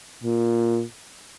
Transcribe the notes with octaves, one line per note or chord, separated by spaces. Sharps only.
A#2